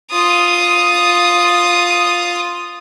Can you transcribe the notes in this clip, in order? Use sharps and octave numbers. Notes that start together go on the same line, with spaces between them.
F4 D#6